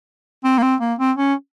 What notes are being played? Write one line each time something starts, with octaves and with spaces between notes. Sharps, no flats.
C4
A#3
C4
A#3
C4
C#4